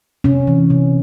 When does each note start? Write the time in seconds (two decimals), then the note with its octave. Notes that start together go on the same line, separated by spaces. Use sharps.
0.24 C3 C#4
0.47 E3
0.70 C3